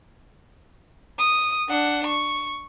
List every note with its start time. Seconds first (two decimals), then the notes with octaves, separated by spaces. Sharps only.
1.19 D#6
1.68 D4 F#5
2.07 C#6